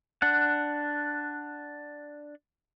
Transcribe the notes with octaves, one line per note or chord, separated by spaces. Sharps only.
D4 F#5